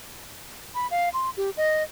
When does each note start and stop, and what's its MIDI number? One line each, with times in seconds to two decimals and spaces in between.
0.75 0.87 83
0.91 1.09 77
1.13 1.30 84
1.37 1.50 67
1.57 1.83 75